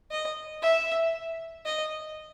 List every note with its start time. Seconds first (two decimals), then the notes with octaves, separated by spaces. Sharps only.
0.11 D#5
0.62 E5
1.65 D#5